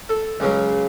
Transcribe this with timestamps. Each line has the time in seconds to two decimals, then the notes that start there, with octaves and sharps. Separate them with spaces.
0.09 A4
0.40 C#2 C#3 F#3